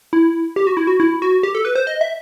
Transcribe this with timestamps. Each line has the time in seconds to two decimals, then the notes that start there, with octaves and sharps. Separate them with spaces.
0.13 E4
0.56 G4
0.67 F#4
0.77 E4
0.87 F#4
1.00 E4
1.22 F#4
1.43 G4
1.55 A4
1.65 B4
1.75 C5
1.87 D#5
2.01 E5